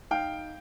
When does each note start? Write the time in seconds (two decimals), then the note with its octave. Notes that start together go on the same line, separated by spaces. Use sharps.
0.11 D#4 F5 G5